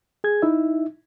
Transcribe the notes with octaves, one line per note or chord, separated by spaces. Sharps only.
G#4 G#6
D#4 E4 E5